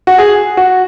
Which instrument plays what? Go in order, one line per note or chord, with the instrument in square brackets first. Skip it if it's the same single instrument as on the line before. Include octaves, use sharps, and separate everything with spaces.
[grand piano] F#4
G#4
F#4